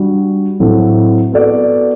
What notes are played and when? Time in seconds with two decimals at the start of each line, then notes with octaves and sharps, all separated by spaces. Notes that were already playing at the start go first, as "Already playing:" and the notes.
Already playing: G3 D4 F#4
0.60 A2 F#3 C4 E4 A4
1.32 B3 F#4 A4 D5